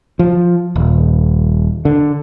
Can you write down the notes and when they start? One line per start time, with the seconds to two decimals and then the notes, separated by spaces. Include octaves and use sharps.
0.19 F3
0.76 D#1
1.85 D3